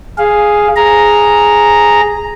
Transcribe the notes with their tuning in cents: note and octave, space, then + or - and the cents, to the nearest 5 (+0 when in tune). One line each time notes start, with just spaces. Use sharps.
G#4 +0 F5 +0
G#4 +0 A#5 +0